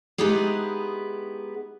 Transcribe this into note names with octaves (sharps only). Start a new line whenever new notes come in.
G#3 B3 D#4 E4 G4 G#4